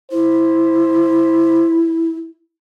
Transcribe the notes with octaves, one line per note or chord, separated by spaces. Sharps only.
E4 C5